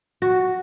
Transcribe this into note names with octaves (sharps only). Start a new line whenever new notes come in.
F#4